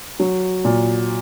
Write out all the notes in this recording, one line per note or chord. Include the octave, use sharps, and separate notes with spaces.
F#3
A#2